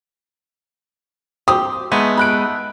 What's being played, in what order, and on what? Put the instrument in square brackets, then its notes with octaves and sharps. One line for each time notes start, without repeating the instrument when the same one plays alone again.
[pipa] C4 G4 [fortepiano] D#6
[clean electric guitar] G#3 B3 D#4 [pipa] A3
[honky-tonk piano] B5 F#6 D7